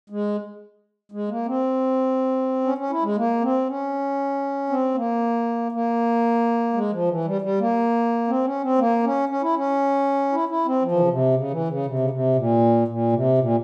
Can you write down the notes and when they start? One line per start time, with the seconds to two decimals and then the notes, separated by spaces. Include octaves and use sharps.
0.10 G#3
1.12 G#3
1.29 A#3
1.46 C4
2.64 C#4
2.78 C#4
2.90 E4
3.03 G#3
3.16 A#3
3.41 C4
3.68 C#4
4.69 C4
4.94 A#3
5.72 A#3
6.73 G#3
6.91 F3
7.08 E3
7.25 G3
7.41 G3
7.59 A#3
8.28 C4
8.44 C#4
8.62 C4
8.78 A#3
9.03 C#4
9.29 C#4
9.42 E4
9.55 C#4
10.32 E4
10.49 E4
10.65 C4
10.82 F3
10.92 E3
10.99 C#3
11.08 C3
11.34 C#3
11.50 E3
11.68 C#3
11.86 C3
11.99 C#3
12.10 C3
12.36 A#2
12.88 A#2
13.13 C3
13.38 A#2